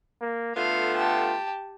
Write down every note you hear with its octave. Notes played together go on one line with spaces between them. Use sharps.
A#3
D3 A3 B3 F4 F5
G4 A5